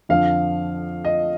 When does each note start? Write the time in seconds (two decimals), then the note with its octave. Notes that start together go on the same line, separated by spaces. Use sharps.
0.09 F2 D3 F3 F5
1.05 D#5